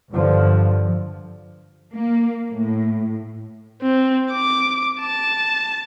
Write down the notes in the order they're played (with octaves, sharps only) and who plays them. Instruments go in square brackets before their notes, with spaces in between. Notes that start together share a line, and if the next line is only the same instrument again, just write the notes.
[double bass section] G2 D3 F3
[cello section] A#3
A2
[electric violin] C4
D6
A5